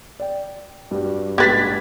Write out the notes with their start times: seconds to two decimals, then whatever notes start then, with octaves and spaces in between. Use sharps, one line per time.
0.20 D5 G5
0.91 G2 G3 F#4
1.38 A#1 G#2 G4 B4 G#6 A6 B6